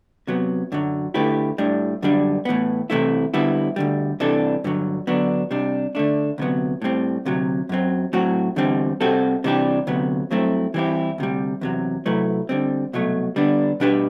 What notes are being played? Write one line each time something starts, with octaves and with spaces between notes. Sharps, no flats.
C3 F#3 B3
F#2 D3 F#3
D3 A3 E4 G4 B4
A2 G3 D4
F#2 D3 G3 D4
A2 E3 B3
C2 C3 E3 A3 E4
D3 G3 B3 E4
D2 D3 G3
C3 E3 G3 D4 A4
G2 D3 F#3
D3 F#3 B3 D4
C3 G3 D4
D3 A3 D4
D2 C3 F#3 B3
A2 G3 C4
D2 C3 F#3
F#2 F#3 C4
A2 F#3 C4 F#4
E2 D3 G3 C4
C3 G3 C4 F#4 A4
C3 E3 G3 D4 G4
D2 C3 F#3 B3
G2 F#3 A3 C4 E4
E3 G3 C4 E4 G4
D2 C3 G3
E2 C3 F#3
C3 F#3 A3 E4 B4
D3 G3 C4
C2 B2 F#3 A3
D3 G3 B3 D4
B2 G3 D4 G4 B4